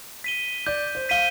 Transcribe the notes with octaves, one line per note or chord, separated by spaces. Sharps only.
B6 D#7 G7
D5 G6
C5
F5 B6 D#7 G7